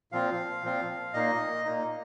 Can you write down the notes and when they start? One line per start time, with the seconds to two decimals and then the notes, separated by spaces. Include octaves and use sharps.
0.12 A#2 F3 C4 F4 F5
0.63 A#2 F3 C4 F4
1.14 A#2 A#3 D#4 D#5
1.65 A#2 A#3 D#4